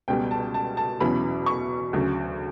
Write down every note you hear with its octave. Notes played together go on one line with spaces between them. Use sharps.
C#2 B2 G3 G5
A5
A5
A5
E2 B2 F#3 C#4 E4 B5
C#6
D2 C#3 F#3